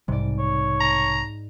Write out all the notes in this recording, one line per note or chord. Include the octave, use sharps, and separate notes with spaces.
B1 G#2 C3 G3 D5
C#5
A#5